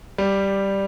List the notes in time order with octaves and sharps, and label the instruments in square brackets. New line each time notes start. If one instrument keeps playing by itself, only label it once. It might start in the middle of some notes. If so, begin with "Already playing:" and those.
[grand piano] G3